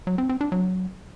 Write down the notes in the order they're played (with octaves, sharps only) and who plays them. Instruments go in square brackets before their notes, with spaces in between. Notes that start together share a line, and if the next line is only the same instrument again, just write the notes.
[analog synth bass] F#3
C4
C4
D4
F#3